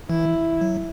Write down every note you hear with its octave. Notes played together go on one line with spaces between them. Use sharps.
E3 E4
F#3